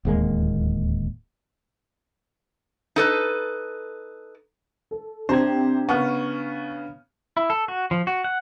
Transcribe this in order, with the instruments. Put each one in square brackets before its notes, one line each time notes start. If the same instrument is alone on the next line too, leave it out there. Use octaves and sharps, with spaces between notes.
[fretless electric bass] D1 D#2 G#3 A#3
[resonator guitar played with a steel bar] D#4 A4 B4
[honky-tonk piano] A4
[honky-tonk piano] C3 G4 [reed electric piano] D4 A#5 G#6 [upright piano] C5
[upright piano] C#3 B3 [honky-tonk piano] C#6 F6
[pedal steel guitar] E4
A4
F#4
F3
F#4
F#5